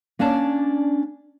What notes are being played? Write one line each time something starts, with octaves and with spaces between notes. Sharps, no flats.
A#3 C#4 D4 D5 A5